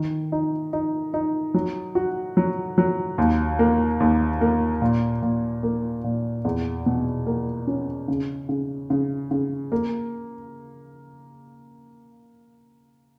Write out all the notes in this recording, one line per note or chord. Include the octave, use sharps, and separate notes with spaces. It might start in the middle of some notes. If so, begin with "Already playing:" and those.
Already playing: D#3
D#4
D#4
D#4
F#3
F#4
F#3
F#3
D#2
A#3
D#2
A#3
A#2
A#2
A#3
A#2
E2
B2
A#3
C#4
C#3
C#3
C#3
C#3
A#3